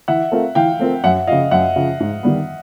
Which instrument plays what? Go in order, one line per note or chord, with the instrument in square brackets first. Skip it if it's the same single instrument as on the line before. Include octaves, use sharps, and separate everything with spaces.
[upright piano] E3 [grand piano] E5 F#5
[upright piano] A3 C4 F4 A#4
[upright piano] E3 [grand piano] F5 G5
[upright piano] A3 C4 F4 A#4
[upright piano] F#2 [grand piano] E5 F#5
[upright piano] C#3 F3 [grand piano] D#5 F5
[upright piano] F#2 [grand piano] E5 F#5
[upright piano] C#3 F3
G#2
D#3 G3 B3